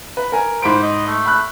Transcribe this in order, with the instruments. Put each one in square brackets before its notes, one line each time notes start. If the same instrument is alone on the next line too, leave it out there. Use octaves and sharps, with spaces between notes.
[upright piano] B4
A#4 G#5
[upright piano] G#2 B5 D7 [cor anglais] C5
[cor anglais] D#5
A3
[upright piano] B5 F#6